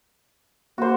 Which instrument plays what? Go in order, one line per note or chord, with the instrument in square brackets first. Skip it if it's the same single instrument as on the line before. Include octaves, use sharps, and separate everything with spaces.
[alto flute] A#3 [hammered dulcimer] F#4 C5